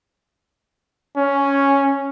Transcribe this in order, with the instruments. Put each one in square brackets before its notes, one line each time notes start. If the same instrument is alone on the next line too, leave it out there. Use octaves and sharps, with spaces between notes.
[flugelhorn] C#4